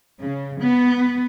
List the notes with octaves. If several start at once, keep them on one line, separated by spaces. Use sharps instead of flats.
C#3
B3